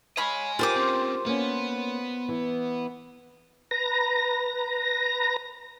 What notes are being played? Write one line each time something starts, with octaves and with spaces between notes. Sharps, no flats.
C#5 D#5 F5 G#5 B5
F4 G4 A#4 C5 D6
C4 C#4
A#3 B3 C#4
E3
B4 A#5 A#6